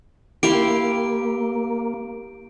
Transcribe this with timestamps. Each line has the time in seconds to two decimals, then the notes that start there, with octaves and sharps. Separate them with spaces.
0.43 A#3 E4 G4 F5 C6 D7